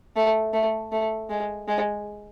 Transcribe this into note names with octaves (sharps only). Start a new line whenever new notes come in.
A3
A3
A3
G#3
G#3